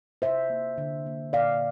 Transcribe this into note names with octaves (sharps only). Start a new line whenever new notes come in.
C3 C5 E5
A#3
D3
A#3
A#2 D5 F5